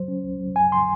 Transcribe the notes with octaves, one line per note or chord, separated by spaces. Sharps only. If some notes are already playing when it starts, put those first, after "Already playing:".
Already playing: F#3 C5
C#4
C2
F#3
F#2 G#5
C6